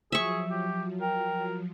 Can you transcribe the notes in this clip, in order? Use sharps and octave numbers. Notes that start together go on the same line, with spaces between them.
F3 F#3 G#4 E5 C#6
G4
A#4 G5